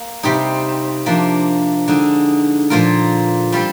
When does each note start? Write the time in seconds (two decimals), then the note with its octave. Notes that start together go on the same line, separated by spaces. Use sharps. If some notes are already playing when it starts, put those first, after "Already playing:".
Already playing: A#3
0.23 C3 G3 C4 D#4 G4
1.06 C3 F3 A#3 D4
1.88 D3 G#3 D#4
2.70 A#2 F3 A#3 F4 A#4
3.52 G3 C4 F4